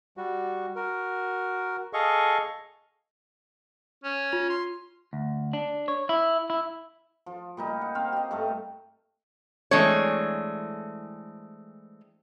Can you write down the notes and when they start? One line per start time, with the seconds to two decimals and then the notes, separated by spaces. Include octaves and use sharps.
0.17 G3 F#4
0.76 F#4 A#4
1.93 G#4 A4 D#5 F5 C#6
4.04 C#4
4.32 F4 F7
4.49 C6
5.13 D2
5.53 D4
5.88 C#5
6.09 E4
6.50 E4
7.26 F3
7.57 A#2 G3 D#4
7.81 F#5
7.95 C4 C5 F5 G5
8.12 G4 D#5
8.31 G2 A3 A4
9.71 E3 G#3 A3 C4 D4 C#5